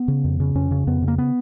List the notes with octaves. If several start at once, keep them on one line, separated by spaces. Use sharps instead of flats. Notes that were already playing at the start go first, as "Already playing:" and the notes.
Already playing: B3
C#3
F2
C#3
F2 C#4
C#3
F2 B3
C#3
A#3
B3